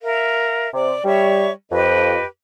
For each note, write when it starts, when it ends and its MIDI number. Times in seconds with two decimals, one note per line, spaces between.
0.03 0.68 70
0.03 0.68 76
0.03 0.68 77
0.73 0.92 48
0.73 1.03 74
0.73 1.03 86
1.05 1.49 55
1.05 1.51 73
1.05 1.51 76
1.05 1.51 85
1.71 2.18 41
1.71 2.25 67
1.71 2.25 71
1.71 2.25 75